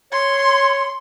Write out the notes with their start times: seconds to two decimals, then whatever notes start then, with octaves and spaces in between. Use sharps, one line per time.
0.12 C#5 C6